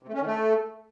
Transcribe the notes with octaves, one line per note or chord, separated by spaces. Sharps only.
C3
A3
C#4
D#3
A3